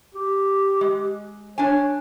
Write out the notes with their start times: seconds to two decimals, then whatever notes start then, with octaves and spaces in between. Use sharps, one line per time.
0.14 G4
0.81 G#3
1.58 D4 C#5 G#5